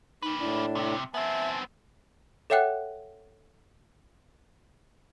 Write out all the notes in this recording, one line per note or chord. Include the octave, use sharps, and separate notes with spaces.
A#3 D#4 B4
A2 D4 E4
C2 C3
B3 C4 E5 G#5 A5
A4 C#5 E5 F#5 G5 F#6